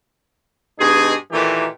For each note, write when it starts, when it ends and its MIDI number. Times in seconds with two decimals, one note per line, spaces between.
0.79 1.14 43
0.79 1.14 47
0.79 1.14 63
0.79 1.14 68
1.32 1.67 46
1.32 1.67 51
1.32 1.67 52
1.32 1.67 57
1.32 1.67 58
1.32 1.67 67